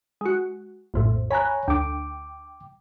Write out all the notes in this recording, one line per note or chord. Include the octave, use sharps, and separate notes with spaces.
G#3 F#4
A#1 F2 A2
C#5 G#5 A#5 B5 F#6
D2 G5 D6